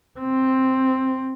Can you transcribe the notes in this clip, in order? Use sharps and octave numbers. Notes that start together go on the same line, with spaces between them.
C4